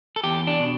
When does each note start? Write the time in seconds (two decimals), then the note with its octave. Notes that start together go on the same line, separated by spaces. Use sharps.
0.16 A4
0.24 E2 G4
0.47 D4
0.60 B2